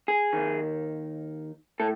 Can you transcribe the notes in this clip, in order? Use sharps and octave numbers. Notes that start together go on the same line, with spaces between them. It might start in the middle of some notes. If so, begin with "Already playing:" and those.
G#4
D#2 D#3
A2 A4